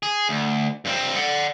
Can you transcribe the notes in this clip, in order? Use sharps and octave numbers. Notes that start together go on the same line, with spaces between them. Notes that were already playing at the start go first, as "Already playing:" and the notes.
G#4
D2
G2 C4
D5 F#5